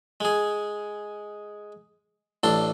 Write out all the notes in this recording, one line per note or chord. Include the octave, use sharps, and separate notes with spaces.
G#3 G#4
A1 D4 A4 C6